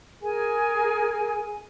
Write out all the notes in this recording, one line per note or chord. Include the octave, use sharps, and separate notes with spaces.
G#4 A#4 G#5